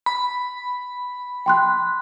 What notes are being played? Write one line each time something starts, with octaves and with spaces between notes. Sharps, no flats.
B5
G5 C6 F#6